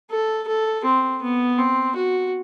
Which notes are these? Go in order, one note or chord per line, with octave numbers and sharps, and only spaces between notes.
A4
A4
C4
B3
C4
F#4